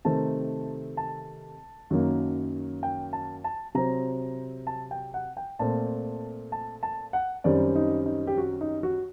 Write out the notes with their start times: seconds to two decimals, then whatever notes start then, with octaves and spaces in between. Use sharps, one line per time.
0.05 C3 D#3 A3 C4 A5
0.97 A5
1.91 F#2 D#3 F#3 A#3
2.83 G5
3.13 A5
3.44 A5
3.75 C3 F#3 C4 A#5
4.67 A5
4.91 G5
5.14 F#5
5.37 G5
5.59 A#2 A3 C4 A5
6.52 A5
6.83 A5
7.13 F#5
7.44 F#2 D#3 G3 C4 D5
7.76 D#4
8.06 D#4
8.27 G4
8.38 F#4
8.61 D#4
8.83 F#4